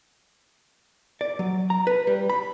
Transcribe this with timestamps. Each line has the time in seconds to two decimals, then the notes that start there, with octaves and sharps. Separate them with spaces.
1.21 D5
1.39 F#3
1.70 A#5
1.87 B4
2.07 G3
2.30 B5